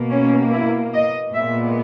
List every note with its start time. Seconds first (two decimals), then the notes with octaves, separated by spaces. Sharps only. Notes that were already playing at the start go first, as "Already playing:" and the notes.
Already playing: B2 A#3
0.10 C#4
0.51 E4
0.94 D#5
1.34 A#2 G#3 B3 E5